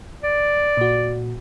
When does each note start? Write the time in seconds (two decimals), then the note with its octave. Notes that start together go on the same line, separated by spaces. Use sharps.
0.23 D5
0.77 A#2 F#4